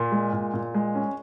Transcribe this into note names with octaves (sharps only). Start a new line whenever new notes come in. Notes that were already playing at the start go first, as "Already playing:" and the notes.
Already playing: A#2
G#3
A#2
A#2
G#3
C#4